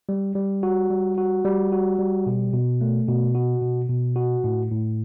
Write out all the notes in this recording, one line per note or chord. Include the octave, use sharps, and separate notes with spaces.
G3
G3
F#4
G3
F#4
G3
F#4
G3
B2
B2
A3
B2
F#4
B2
B2
F#4
A2
A2